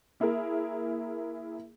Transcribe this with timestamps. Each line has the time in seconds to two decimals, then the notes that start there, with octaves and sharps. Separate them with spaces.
0.20 A#3 E4 G#4 A#4